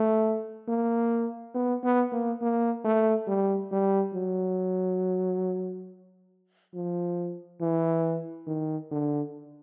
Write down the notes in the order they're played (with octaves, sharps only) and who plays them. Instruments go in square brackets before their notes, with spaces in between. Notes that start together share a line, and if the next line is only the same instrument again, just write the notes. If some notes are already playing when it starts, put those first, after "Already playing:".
Already playing: [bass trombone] A3
A#3
B3
B3
A#3
A#3
A3
G3
G3
F#3
F3
E3
D#3
D3